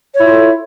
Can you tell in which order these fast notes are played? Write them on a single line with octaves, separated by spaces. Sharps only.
C#5 E4 F4 A4